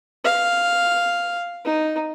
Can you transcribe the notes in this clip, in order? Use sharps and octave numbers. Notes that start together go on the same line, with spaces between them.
F5
D#4